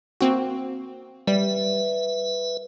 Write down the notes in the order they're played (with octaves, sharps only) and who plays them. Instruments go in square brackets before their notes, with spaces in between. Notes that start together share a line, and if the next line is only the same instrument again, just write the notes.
[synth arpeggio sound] A#3 C4 F#4
[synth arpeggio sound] G3 [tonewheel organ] B4 E5